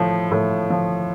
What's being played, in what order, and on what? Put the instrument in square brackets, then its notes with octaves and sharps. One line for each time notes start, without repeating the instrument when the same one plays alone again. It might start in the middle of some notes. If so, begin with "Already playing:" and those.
Already playing: [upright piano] A2 F3
A2
F3